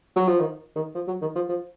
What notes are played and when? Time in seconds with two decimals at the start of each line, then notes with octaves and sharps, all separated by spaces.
0.16 F#3
0.28 F3
0.40 D#3
0.76 D#3
0.95 F3
1.07 F#3
1.21 D#3
1.35 F3
1.49 F3